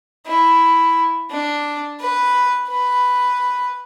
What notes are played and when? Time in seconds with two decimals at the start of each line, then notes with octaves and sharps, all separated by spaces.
0.27 E4
1.31 D4
2.00 B4
2.69 B4